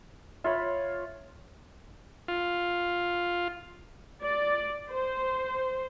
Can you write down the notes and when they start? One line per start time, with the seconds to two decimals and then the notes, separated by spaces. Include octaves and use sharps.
0.44 F4 C#5 E5 B5
2.28 F4
4.23 D5
4.90 C5